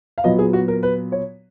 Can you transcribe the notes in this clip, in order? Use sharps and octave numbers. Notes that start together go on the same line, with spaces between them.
F5
A#2 F#3 B3 D#5
G#4
F#4
A#4
B4
C#5